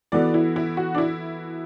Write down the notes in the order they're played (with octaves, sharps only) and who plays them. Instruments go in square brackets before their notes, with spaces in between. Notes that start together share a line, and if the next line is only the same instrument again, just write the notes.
[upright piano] E3 B3 F#4 A4 [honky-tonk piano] D5
[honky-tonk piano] E4
E4
F#4
D4
E4